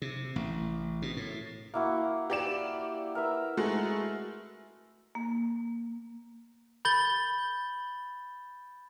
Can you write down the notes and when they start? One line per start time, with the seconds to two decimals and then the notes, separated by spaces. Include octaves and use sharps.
0.02 C3
0.36 A1
1.02 B2
1.17 A2
1.74 A#3 E4 F#4
2.30 G4 D5 E7
3.15 A#4 B4 E5
3.57 G#3 A3 F#4
5.15 A#3
6.85 B5 G6 A6 G7